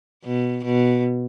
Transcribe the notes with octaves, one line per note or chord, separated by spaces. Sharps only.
B2
B2